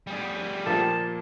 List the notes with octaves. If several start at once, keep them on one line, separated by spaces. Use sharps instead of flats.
G3 G#4
A#2 F3 A#3 A5